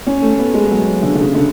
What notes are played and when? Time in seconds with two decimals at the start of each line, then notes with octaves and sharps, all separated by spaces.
0.07 C#4
0.22 A3
0.39 B3
0.54 G#3
0.71 F#3
1.03 D3
1.15 D3
1.19 C#3
1.34 D3